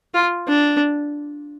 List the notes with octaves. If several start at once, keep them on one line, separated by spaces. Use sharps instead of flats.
F4
D4